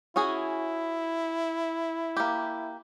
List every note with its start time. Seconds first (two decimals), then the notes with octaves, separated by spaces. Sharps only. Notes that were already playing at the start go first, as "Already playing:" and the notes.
0.16 C#4 E4 F#4 G#4
2.17 A#3 G4